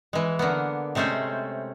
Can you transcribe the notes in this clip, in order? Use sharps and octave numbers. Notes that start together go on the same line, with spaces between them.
E3 G#3
D3 A#3 B3
C3 G#3 A3 C#4 C5